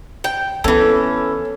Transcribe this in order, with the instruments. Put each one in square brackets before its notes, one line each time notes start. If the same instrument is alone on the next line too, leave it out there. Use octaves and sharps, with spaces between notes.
[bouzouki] G5
[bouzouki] E3 C#4 [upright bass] B3 E4 [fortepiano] A4